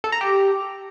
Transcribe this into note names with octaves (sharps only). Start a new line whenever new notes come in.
A4
A#5
G4